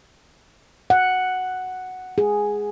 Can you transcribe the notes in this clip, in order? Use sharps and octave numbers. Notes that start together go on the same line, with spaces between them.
F#5
G#4